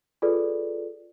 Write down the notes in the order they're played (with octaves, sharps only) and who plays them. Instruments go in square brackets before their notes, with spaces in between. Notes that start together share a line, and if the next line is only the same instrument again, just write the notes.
[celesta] F4 G#4 A4 B4 D5